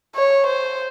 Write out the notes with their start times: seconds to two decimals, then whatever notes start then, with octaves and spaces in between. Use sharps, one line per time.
0.16 C#5
0.47 C5